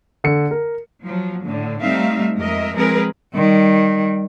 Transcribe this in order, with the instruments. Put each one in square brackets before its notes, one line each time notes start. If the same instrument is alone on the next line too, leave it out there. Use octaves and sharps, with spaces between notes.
[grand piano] D3 C#7
A#4
[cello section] F3 F#3
A2 D3
G3 A3 C4 D#4 E5 F5
F2 G#3 A#4 D#5 E5
F3 G#3 C4 G#4 A#4 B4
[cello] D#3 G3